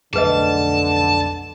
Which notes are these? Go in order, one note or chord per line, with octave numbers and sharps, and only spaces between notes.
B1 F2 D3 A3 G#4 B4 D#5 A5